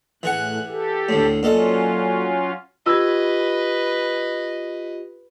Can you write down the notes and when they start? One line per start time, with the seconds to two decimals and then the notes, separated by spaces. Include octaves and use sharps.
0.23 A2 E3 G#4 F#5 F#6
0.68 G4 A4
1.09 D2 A2
1.43 A#2 F#3 C#4 F4 A4 D#5
2.86 F4 G4 B4 D#5 E6 G#6